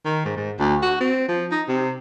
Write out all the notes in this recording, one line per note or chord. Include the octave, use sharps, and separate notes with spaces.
D#3
G#2
G#2
D2
F#4
C4
F3
D#4
C3